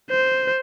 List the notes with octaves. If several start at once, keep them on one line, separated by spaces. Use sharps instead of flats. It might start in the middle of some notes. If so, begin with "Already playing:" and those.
C5